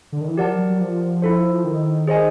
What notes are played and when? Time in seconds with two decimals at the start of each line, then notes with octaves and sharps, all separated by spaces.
0.12 D3
0.21 D#3
0.28 E3
0.37 F3 G4 A#4 D5 F#5 A5
0.48 F#3
0.58 F#3
0.70 F#3
0.80 F3
1.22 E4 A4 C5
1.64 D#3
2.07 G#4 C5 D#5 G#5